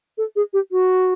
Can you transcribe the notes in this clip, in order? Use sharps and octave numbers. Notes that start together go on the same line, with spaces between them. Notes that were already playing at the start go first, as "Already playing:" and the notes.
A4
G#4
G4
F#4